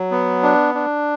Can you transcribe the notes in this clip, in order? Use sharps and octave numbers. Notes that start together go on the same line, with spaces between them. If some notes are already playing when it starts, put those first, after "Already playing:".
Already playing: F#3
B3
D4
D4